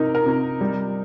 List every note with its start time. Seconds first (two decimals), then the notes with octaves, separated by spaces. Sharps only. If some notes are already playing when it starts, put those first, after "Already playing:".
Already playing: C3 D#4 A#4
0.15 A#4
0.26 C3
0.61 G3